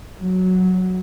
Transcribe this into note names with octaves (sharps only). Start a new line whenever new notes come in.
F#3